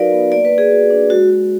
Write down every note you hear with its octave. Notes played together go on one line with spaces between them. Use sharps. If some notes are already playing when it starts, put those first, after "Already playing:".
Already playing: F#3 D#4 F#4 A#4 B4 D5 F5
B3
A#3 D5
B4
A#3
G#4
F#4
D4
G#3 F#4
F#4